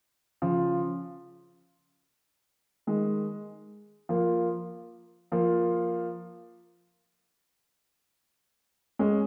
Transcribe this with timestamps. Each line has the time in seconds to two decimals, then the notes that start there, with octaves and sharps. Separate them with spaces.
0.42 C#3 F3
2.87 D#3 G#3
4.09 F3 A#3
5.32 F3 A#3
8.99 G#3 C#4